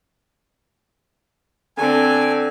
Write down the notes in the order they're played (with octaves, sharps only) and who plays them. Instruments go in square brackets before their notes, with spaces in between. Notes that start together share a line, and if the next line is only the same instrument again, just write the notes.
[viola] D3 C4 [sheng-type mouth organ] G#5